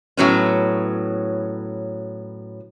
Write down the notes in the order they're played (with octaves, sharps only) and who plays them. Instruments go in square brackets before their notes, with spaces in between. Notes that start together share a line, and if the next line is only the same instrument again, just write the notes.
[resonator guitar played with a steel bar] A2 F#3 B3 C#4